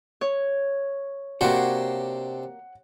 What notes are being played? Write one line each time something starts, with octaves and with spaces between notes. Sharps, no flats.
C#5
C3 A#3 D4 F#4 C5 F#5